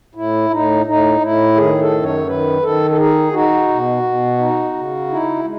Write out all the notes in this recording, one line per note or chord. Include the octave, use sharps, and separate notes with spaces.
A2 E4
A2 D#4
A2 D#4
A2 E4
D#3 G#4
A4
F#2
C#5
D#3 B4
D#3 A4
A4
D#4 G#4
D#4 F#4
B2
B2
D#4
C#3
D#4 E4
G#3